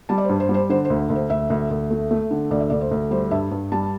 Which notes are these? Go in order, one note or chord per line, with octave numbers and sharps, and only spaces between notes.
G3 A5
D5
C5
G2
C5
G3
C5
D3 C5
C5
D2
D2
C5
D2 E5
D2
D2
A3
A3
D3
D2 D5
E5
D2 D5
C5
D2
G3 C5
G2 E5
G2
G3 A5